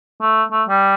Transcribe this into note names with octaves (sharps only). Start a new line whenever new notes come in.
A3
A3
G3